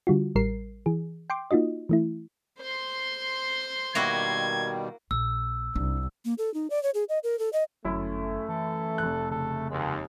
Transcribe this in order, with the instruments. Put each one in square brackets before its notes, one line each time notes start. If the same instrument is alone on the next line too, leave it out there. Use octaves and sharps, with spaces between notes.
[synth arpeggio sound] D3 G3 F4 F#4
A1 G3 A#4 C7
E3 G#4
G5 C6 D6
A#3 D#4 F4 F#4 D#5
E3 A3 E4
[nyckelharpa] C5 C6
[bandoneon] B2 D#3 G3 [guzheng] A#3 E4 F#4 [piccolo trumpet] G#6
[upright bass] A#1 [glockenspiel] E6
[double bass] C2 [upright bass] D4 D#4
[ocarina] A#3
A4
D#4
D5
C#5
G#4
D#5
A#4
A4
D#5
[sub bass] G1 [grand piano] F#2 C#4 E4 [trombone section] A3
[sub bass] E3 [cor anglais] A4
[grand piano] F1 F#6
[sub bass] C#3 [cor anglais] A4
[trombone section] D#2 [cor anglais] G#3